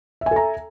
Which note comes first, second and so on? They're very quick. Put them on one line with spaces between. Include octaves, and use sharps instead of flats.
E5 G#5 A4 A#5